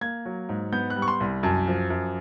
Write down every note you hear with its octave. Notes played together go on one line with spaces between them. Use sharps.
A#3 G#6
F#3
G#2
B3 G6
F#6
G3
C#6
C6
C2
F#2 A5
F3
F#2